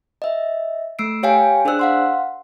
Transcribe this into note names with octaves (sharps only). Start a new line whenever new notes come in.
D#5 E5
A3 E6 C7 D7
G4 C#5 F5 G5 G#5
D4 G#4 C5 D5 E6 F#6
F5 F#5 C6